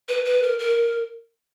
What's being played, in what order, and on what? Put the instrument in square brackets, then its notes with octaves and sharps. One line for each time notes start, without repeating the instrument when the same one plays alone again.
[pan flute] B4
B4
A#4
A#4